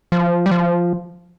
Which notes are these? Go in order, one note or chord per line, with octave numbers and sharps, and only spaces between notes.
F3
G3
F3